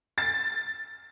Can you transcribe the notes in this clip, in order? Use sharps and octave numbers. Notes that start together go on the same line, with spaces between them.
A6